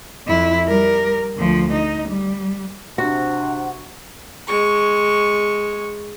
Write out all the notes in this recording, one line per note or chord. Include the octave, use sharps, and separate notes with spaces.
F2 E4
G3 A#4
D2 F3
D#4
G3
C3 D4 F#4 F#5
G#3 C#6